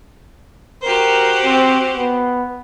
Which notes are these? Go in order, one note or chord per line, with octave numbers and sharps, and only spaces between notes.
F#4 G4 A#4 C5
C4
B3